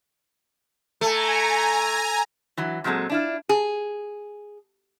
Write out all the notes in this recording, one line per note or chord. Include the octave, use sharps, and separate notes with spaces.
A3 G#5 A#5
E3 F#3
A#2 F#3 G#3 C4 A4
D4 E4 F4
G#4